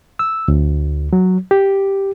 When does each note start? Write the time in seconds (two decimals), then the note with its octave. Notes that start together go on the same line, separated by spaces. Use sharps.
0.19 E6
0.48 D2
1.13 F#3
1.51 G4